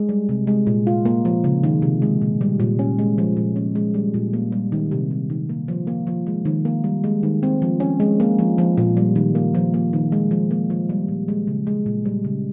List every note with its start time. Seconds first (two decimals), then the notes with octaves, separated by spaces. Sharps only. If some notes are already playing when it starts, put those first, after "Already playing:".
Already playing: G#3
0.09 G3
0.29 C3
0.47 G#3
0.67 A#2
0.87 F4
1.05 A#3
1.25 F3
1.44 C#3
1.64 D#3
1.82 C3
2.02 G#3
2.22 A#2
2.41 G3
2.60 A#2
2.79 C#4
2.99 G#3
3.18 F3
3.37 A#2
3.56 C#4
3.75 G#3
3.94 G3
4.14 A#2
4.33 A#3
4.52 G3
4.72 D#3
4.91 C3
5.11 G3
5.30 D#3
5.49 A#3
5.68 F3
5.87 A#3
6.07 F3
6.27 G#3
6.45 D#3
6.65 A#3
6.84 G3
7.04 G#3
7.23 D#3
7.43 C4
7.62 F3
7.80 C#4
8.00 G#3
8.20 A#3
8.39 F3
8.58 F3
8.78 A#2
8.97 G3
9.16 D#3
9.35 A#3
9.55 F3
9.74 A#3
9.93 D#3
10.12 G#3
10.31 F3
10.51 A#3
10.70 F3
10.89 G3
11.08 A#2
11.28 G#3
11.48 C#3
11.67 G#3
11.86 A#2
12.05 G3
12.24 C#3